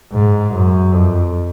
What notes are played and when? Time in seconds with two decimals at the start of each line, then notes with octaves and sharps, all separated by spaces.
0.12 G#2
0.54 F#2
0.94 F2